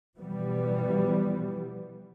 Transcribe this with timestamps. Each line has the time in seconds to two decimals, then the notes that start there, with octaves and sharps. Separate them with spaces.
0.19 B2 E3 F3 G3 B3